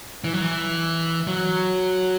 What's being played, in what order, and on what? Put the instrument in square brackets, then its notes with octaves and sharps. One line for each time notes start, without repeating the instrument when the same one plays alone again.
[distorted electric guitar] E3
F#3
E3
F#3